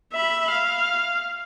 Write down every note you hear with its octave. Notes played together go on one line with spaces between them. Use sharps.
E5 B5
F5